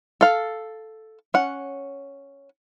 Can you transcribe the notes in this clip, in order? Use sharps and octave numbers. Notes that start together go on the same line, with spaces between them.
A4 F5
C#4 F#5